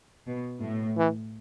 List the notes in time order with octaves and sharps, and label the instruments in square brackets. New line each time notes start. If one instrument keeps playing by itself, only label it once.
[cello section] B2
A2
[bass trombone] E3